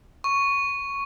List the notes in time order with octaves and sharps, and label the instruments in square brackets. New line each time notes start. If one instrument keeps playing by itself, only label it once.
[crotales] C#6